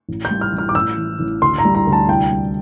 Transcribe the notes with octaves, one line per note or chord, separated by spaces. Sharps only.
A1
G6
G3
F6
A1
F6
D6
A1 E6
E3
A1
D2 C6
A#5
G3
A#5
D2
A5
C2 G5
G3